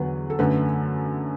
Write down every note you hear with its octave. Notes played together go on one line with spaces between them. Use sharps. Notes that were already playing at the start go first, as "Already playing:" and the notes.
Already playing: E2 D3 F#3 B3 B4
A4
F#2 D3 A3 B4